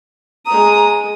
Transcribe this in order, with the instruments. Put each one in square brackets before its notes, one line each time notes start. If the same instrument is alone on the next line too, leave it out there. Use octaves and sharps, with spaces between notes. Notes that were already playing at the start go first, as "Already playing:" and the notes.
[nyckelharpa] G#3 D#6 [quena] A#5